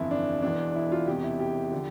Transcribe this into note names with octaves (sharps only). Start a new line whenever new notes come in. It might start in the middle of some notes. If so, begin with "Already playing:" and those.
Already playing: G1 F2 E3 E4
D4
E1 E2 E3 D4
E4
F4
E1 E2 C3 G4
E4
G4
D3 F3